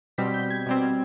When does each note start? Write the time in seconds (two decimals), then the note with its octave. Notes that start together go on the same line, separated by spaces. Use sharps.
0.18 B2 G3 C4 B6
0.34 G6
0.50 G#6
0.66 B2 G3 C4